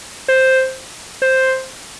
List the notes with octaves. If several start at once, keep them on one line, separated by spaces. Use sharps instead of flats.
C5
C5